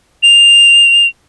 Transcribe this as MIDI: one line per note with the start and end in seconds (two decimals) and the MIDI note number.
0.23 1.07 101